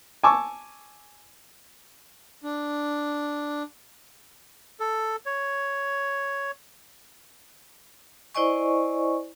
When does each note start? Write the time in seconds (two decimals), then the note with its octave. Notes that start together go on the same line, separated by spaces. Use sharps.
0.23 G#5 A5 C#6 D6 E6
2.43 D4
4.80 A4
5.26 C#5
8.34 E4 C5 D5 D#5 G#5 C#6